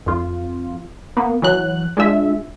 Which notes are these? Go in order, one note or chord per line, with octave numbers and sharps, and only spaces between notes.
F2 F4
A#3 B3
E3 F#3 F#6
G#3 D4 F4 E5